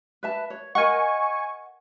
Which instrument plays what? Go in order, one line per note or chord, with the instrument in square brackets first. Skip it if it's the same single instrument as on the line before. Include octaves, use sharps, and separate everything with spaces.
[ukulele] B4 E5 A5
C#5
[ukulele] A#4 D#5 F#5 [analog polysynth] G#5 C#6